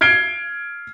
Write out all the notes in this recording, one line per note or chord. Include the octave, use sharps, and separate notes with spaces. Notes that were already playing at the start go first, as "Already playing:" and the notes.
F6 G#6 C7 D7 G7